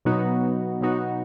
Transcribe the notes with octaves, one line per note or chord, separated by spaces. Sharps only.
B2 F#3 B3 D#4 F#4
B2 F#3 B3 D#4 F#4